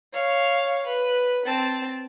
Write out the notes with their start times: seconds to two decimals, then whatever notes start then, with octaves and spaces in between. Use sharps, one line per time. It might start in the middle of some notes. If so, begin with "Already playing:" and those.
0.13 C#5 F5
0.86 B4
1.45 C4 A5